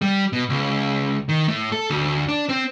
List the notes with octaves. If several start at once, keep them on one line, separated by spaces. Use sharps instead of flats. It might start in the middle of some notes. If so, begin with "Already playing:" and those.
G3
B2
C#2
D#3
A2
A4
D2
D4
C4